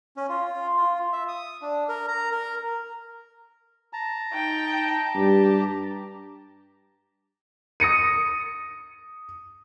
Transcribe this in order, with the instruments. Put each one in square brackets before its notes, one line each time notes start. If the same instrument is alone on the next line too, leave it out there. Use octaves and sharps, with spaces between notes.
[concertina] C#4
F4
F4
E5
D#6
D4
A#4
A#5
A#4
[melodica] A5 A#5
[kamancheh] D#4 G5
[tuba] G2 [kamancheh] G4
[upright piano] D#6 A#6 C#7 D#7